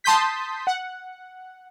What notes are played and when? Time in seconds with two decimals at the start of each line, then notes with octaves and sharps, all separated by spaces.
0.04 A5 C6 D#6 G6 B6
0.67 F#5